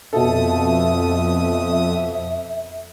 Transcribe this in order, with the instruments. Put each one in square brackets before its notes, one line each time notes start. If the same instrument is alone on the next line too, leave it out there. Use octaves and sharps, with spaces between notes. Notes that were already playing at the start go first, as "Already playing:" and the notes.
[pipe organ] F2 D#6 [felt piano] B2 A4 [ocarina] E5